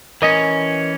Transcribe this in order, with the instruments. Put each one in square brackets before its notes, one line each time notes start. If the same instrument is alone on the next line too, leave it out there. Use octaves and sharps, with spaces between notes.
[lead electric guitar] E3 C#4 [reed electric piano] A#4 D#5